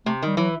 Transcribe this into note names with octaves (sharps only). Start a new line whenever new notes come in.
C3 A3
D#3 G3
E3 F#3